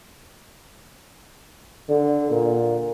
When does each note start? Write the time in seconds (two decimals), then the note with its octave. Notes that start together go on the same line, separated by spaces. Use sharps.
1.89 D3
2.31 A#2